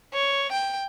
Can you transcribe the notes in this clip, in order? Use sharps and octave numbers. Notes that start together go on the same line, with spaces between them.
C#5
G5